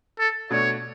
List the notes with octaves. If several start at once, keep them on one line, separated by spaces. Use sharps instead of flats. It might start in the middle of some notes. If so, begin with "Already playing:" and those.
A4
B2 A3 D4 C#5